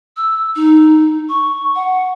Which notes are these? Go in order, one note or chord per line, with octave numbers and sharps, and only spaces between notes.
E6
D#4
C#6
F#5